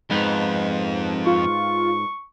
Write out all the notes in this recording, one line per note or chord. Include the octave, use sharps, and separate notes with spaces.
F2 G#2 B3 D#4
F4 C#6